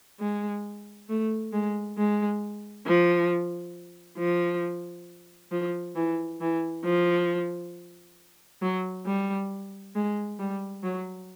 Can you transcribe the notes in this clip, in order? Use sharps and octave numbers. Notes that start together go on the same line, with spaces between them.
G#3
A3
G#3
G#3
F3
F3
F3
E3
E3
F3
F#3
G3
G#3
G3
F#3